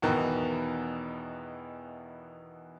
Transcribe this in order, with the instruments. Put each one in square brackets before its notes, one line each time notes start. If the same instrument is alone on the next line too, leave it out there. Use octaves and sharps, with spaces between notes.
[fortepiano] E2 B2 D#3 E3